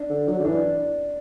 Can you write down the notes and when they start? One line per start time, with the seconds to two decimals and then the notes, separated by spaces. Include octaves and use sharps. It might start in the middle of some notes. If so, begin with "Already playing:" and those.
Already playing: D4
0.10 D3
0.28 F#3
0.39 D3
0.44 E3 D4